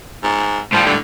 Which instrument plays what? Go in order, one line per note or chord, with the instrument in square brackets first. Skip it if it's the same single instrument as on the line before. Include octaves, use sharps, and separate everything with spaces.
[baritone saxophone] G#2
[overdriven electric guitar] A2 G3 [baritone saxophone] F3
[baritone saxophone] D3